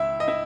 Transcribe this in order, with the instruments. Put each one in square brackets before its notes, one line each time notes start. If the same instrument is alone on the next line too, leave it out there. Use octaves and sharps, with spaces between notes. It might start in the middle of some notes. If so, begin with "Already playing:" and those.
Already playing: [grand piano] C#2 E4 E5
D#5
E4 E5